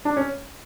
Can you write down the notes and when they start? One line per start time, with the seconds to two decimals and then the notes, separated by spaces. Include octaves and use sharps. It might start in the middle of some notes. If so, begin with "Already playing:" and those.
0.05 D4
0.17 C#4